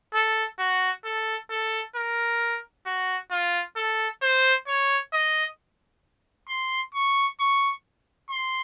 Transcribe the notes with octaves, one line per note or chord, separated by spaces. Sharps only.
A4
F#4
A4
A4
A#4
F#4
F4
A4
C5
C#5
D#5
C6
C#6
C#6
C6